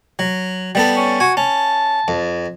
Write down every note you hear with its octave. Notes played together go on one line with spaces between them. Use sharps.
F#3
G3 B3 A4
C#4
F#4 G#5
C#4 A5
F2